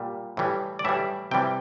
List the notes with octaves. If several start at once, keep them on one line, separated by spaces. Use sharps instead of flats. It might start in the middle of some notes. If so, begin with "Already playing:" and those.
Already playing: A#2 G3
A2 E3 G3
D5
A2 E3 G3 E5
C3 E3 G3 G5